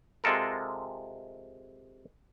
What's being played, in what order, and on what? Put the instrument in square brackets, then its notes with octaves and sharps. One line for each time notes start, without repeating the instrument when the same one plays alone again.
[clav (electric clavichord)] C3 G#3 F4 A4 A#4